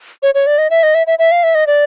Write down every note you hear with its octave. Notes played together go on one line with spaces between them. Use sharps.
C#5
C#5
D5
D#5
E5
D#5
E5
E5
E5
F5
E5
D#5
D5